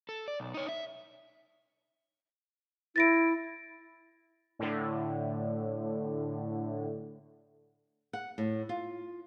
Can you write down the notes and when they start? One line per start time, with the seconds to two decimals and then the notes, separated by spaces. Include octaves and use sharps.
0.09 A4
0.28 D5
0.40 B1
0.54 D#4 C#5
0.68 E5
2.96 E4 A6 A#6 D7
4.59 A2 D3
8.13 F#5
8.38 A2
8.69 F4